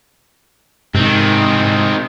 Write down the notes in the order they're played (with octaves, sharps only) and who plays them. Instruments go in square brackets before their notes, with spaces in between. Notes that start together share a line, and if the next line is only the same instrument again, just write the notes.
[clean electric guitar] G#2 C3 [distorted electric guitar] D#3 C4